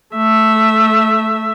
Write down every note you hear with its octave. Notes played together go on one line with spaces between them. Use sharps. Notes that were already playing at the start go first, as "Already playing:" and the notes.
A3 E5